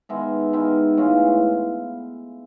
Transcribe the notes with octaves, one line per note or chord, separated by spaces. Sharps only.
D#3 G#3 B3 E5
D#3 G#3 B3 E5
A2 E3 G#3 F5